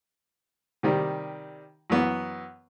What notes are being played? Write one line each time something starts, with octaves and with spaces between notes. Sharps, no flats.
C3 D#3 G3
F#2 E3 B3